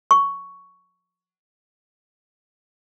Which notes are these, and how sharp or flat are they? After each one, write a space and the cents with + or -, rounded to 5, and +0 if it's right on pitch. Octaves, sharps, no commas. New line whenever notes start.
C#6 +10